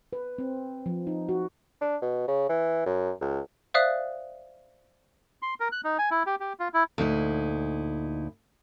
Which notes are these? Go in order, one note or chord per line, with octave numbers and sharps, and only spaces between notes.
B4
C4
F3
D#4
F#4
D4
B2
C#3
E3
F#2
C#2
C5 D5 E5 F5 D#6 F#6
C6
A#4
F#6
D#4
G#5
E4
G4
G4
F4
E4
D2 A#2 D#4 E4